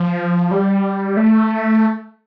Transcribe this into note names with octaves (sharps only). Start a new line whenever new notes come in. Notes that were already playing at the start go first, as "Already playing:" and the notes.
Already playing: F3
G3
A3